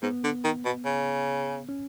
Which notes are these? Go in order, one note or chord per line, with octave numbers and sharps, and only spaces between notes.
G#2 B3
D3
D#3
B2
C#3
C#4